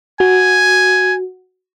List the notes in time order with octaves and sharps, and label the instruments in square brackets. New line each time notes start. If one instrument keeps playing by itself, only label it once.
[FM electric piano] F#4 [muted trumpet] G#5